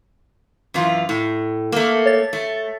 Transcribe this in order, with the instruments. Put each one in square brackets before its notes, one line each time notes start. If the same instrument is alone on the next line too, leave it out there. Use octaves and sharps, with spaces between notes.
[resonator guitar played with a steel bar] F#2 E3 F4
A2
A3 A#3
[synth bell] C#5 A6
[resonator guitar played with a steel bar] A3